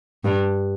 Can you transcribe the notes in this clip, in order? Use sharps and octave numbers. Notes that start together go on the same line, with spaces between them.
G2